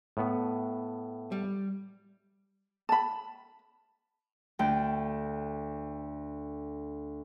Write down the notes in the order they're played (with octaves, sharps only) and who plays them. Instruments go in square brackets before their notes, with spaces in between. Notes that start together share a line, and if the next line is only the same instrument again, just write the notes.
[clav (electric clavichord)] A2 B3
[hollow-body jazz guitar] G3
[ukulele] A5 B5
[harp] D2 G5